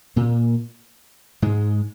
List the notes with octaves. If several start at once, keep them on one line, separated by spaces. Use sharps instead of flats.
A#2 A#3
G#2 G#3